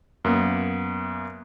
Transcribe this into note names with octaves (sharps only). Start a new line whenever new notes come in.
F#2 A#3 B3